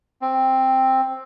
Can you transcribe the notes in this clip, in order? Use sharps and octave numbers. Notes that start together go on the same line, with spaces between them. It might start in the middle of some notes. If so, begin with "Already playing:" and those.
C4